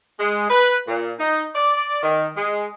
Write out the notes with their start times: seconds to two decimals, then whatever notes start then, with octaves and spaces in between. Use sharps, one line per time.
0.19 G#3
0.50 B4
0.88 A#2
1.19 D#4
1.55 D5
2.03 D#3
2.37 G#3